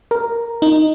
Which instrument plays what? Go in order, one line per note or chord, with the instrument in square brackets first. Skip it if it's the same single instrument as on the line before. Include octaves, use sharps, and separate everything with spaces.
[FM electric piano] A#4
D#4